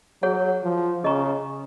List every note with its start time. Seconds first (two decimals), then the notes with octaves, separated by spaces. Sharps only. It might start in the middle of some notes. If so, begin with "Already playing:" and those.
0.22 F#3 G#4 C#5 F#5
0.63 F3
1.04 C#3 G#4 D#5 A#5 C#6